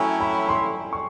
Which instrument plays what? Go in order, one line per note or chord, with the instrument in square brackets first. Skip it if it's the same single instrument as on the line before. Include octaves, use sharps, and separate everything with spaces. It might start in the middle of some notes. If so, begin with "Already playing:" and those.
Already playing: [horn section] F#3 A3 C#4 E4 [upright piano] G5 G#5
[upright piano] B5
C6
C#6